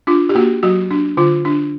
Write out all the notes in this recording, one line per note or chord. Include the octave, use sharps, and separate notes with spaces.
D4 F4
G4
A#3 F#4
F#3 F#4
D4
D3 F4
D4